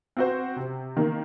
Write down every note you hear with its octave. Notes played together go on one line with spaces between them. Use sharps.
C4 F#4 C5
C3
D#3 A#3